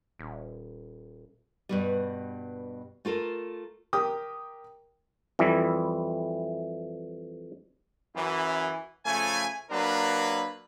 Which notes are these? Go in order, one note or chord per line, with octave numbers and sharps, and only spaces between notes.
D#1
G2 B2 G3
A3 F4 A4 A#4
G4 A#4 G5 D#6
F2 E3 G3 E4
F#2 E3
C#3 F3 A3 G#5
F#3 A#3 D4 A#4 B4